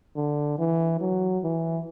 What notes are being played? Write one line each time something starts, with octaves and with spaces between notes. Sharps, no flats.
D3
E3
F#3
E3